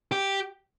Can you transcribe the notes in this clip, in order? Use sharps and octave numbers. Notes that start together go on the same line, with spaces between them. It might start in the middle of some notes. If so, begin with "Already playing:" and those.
G4